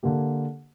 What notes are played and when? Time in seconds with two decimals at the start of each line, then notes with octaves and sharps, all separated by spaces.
0.03 D3 A#3 G4